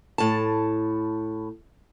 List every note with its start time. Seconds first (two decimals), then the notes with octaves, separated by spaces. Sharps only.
0.18 A2 A5